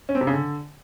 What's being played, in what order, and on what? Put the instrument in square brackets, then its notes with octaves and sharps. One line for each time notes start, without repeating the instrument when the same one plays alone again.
[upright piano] C#4
C4
C3
C#3
D3